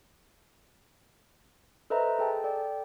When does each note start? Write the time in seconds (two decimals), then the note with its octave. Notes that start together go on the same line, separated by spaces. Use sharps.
1.90 A4 B4 C5 D#5 E5 A#5
2.19 G#4 A4 G5 A5
2.44 A4 D5 G5